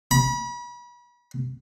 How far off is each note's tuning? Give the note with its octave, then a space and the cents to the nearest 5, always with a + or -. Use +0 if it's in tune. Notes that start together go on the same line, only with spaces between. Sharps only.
B5 -35